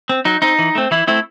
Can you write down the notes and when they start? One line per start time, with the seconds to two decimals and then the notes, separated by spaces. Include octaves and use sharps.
0.09 C4
0.25 F#3 D#4
0.42 C4 D#4
0.59 E3
0.75 A3 C4
0.91 E3 E4
1.07 A3 C4 E4